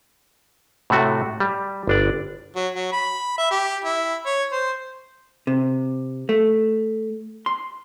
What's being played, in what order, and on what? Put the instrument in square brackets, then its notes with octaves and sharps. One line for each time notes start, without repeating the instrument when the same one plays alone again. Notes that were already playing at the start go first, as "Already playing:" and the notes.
[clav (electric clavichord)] A2 C3 A3 F#4
G3
G1 D4 D5
[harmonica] F#3
F#3
B5
E5
G4
E4
C#5
C5
[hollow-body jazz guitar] C3
A3
C6